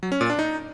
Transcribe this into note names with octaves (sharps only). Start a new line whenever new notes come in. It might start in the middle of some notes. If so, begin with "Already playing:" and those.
F#3
C#4
A#2
D4
D#4